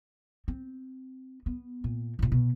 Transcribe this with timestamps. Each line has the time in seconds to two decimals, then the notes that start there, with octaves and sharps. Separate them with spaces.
0.48 C4
1.46 B3
1.84 A#2
2.19 A1 A#2
2.32 B2